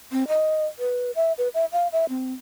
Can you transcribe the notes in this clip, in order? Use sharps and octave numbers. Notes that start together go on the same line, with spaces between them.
C4
D#5
B4
E5
B4
E5
F5
E5
C4